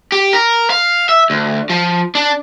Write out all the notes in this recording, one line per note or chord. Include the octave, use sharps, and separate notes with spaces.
G4
A#4
F5
E5
D2
F3
D4